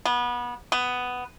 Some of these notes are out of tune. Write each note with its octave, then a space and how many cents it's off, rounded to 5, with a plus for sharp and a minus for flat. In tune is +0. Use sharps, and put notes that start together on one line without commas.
B3 -25
B3 +10